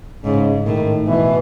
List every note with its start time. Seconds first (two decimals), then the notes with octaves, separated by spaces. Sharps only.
0.24 G#2 C#3
0.66 A2 D#3
1.07 B2 E3